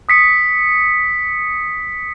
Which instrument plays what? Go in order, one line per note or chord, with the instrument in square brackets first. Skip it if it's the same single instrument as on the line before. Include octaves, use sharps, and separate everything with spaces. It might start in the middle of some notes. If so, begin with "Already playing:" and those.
[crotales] D#6 B6 C#7